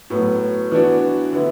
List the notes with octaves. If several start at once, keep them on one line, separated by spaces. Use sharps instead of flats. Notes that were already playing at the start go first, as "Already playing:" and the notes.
A2 F#3 B3
E3 B3 D4 F#4
D3 B3 E4